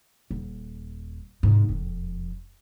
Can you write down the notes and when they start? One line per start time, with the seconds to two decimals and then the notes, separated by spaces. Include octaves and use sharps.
0.31 D#1
1.43 G#2 C3
1.69 E1 F2